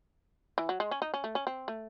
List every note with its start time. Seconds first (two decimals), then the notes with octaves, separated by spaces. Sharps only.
0.58 E3
0.69 F#3
0.80 G#3
0.91 C#4
1.02 D#4
1.14 C#4
1.24 A3
1.35 C#4
1.47 C4
1.68 A3